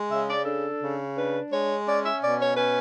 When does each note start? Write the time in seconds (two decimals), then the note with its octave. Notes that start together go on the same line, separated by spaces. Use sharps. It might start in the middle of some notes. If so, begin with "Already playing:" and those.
Already playing: G#3
0.10 C#3 E5
0.27 D5
0.45 D4 A4
0.80 C#3
1.15 D4 B4
1.50 G#3 C#5
1.86 C#4 D5
2.04 E5
2.21 B2 D5
2.39 C#5
2.56 C#4 B4